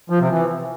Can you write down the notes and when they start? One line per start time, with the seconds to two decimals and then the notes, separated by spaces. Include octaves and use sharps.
0.10 F3
0.20 C3
0.31 E3